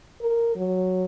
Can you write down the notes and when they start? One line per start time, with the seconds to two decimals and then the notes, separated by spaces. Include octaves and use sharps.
0.21 A#4
0.56 F#3